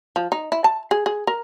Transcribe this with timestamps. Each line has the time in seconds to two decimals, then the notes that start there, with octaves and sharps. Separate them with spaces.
0.16 F3
0.32 D#4
0.52 E4
0.64 A5
0.91 G#4
1.06 G#4
1.27 A#4